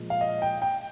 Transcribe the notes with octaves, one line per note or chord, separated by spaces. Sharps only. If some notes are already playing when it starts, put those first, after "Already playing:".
Already playing: A#2 F3 G#3
F5
D#5
G5
G5